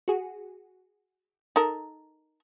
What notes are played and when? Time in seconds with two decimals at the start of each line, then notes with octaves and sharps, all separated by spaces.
0.08 F#4 G#4
1.56 D#4 A4 A#4